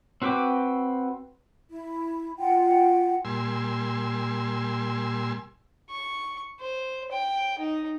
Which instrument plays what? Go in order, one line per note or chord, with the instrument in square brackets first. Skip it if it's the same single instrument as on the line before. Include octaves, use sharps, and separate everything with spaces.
[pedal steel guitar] C4 F#4 B4 G5 D6
[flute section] E4
F4 F#5 G5
[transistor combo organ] A#2 G3 G#5 C6 E6
[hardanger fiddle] C#6
C5
G5
D#4